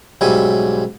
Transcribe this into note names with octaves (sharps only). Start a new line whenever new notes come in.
B1 G#2 G3 C#4 E5 G#5